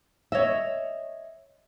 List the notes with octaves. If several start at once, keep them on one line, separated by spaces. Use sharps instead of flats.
C#5 D#5 E5